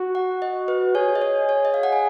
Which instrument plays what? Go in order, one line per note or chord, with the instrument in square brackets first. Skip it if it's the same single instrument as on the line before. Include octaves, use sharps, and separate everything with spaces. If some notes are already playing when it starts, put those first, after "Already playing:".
Already playing: [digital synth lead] F#4
[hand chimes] F#5
D#5
B4
[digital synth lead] G#4 [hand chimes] C#5
[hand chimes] D#5
C#5
C#5
D#5
F5
F#5
G#5